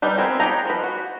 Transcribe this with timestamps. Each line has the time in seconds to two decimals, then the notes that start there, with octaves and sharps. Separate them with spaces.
0.02 G3 D#4 B4
0.18 B3 C4 G#4 A#4
0.40 B3 D#4 G4 G#4 A#5
0.65 F3 B4
0.84 F#4